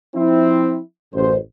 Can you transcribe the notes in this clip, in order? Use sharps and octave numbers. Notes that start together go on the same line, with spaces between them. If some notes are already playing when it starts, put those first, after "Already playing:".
F3 C4 E4
A1 F#2 C5